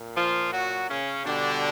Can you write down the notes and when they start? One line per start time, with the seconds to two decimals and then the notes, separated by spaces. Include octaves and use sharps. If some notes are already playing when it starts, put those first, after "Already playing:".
Already playing: A#2
0.16 F3 F4
0.53 F#3 F#4
0.89 C#3 C#4
1.25 B2 D3 G3 D4